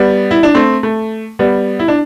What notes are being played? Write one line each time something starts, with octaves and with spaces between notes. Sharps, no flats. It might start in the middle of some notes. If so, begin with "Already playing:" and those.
Already playing: G3 B3
E4
D4
A3 C4
A3
G3 B3
E4
D4